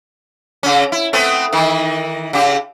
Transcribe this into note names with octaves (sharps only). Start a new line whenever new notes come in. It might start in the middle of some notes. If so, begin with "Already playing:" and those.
C#3 C#4
E4
A3 B3 C4
D#3 E3
C#3 G4